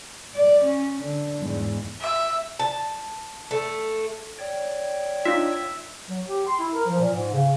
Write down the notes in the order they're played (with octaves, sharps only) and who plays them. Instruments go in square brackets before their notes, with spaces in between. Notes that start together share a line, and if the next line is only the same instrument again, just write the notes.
[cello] D5
C#4
D3
E2 G#2
[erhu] E5
[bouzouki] A5
A3
[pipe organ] C#5 D5 G5
[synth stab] D4 D#4 F4 [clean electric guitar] E5
[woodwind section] F#3
G4
C6
E4
A#4
F3
A#2
G#2
C#3